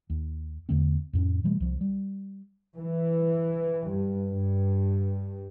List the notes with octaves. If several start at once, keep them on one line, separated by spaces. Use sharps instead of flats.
D#2
E2 D3 A3 C4
F2 A2 C#4
B2 E3 G3 A3
C2 F3
G3
E3
G2
G2